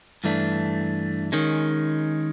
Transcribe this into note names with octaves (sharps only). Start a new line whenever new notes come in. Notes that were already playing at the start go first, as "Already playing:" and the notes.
G2 E3 A3 D4
D#3 G#3 C#4